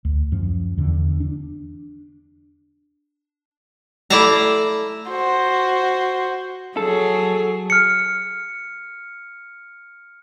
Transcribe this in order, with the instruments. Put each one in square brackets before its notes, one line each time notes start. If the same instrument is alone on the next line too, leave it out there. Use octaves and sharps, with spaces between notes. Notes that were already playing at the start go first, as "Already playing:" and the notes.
[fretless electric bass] D2
F#2 F3
E2 D3
D4
[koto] A3 E4 D5 F5 A5 A#5
[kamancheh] F#4 C5
[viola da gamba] F#3 G#4 [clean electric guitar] A4
[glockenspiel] F6 C#7